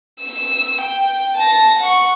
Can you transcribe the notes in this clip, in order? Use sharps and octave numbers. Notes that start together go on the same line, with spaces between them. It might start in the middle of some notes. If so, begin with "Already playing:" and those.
E6 E7
G5
A5 A#6
F#5 C#6